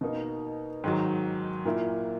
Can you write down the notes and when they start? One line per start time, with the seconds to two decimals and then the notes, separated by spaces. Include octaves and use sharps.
0.01 B2 A#3 D#4
0.84 G#2 D#3 F#3
1.65 A#2 A#3 E4